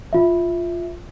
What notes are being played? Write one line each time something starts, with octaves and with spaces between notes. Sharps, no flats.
F4 E5